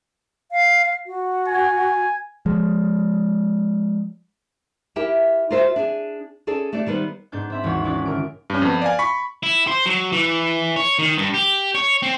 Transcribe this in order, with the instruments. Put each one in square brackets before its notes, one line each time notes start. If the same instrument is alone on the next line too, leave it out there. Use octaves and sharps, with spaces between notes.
[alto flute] F5
F#4
[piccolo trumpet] G#5
[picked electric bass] F3 G#3
[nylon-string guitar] E4 G4 A#4 E5 G5
F4 F#4 A#4 C5 D#5 E5
D4 G#4
C#4 G#4 A4 D5
A3 D4 G4 D5
D#3 G3 B3 B4 C5
[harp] G#2 B3 D4 G6
C4 E5 B5
G#1 D#2 E3 F#4 C#5 F#5
G#3 C#4 E4 C#5 D5
D3 A#4 D7
[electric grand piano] G2 C#4
F2 B3
D5 F5 G#5
B5 C#6 B6
[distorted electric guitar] E4
C5
F#3
E3
C#5
D#3
G2
G4
C#5
C4